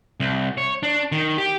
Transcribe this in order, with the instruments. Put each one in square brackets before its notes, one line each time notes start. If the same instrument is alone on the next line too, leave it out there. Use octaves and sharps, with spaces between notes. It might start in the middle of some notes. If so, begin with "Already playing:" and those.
[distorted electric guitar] C2
C#5
D4
D#3
G4